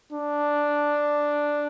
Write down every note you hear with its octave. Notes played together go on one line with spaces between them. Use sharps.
D4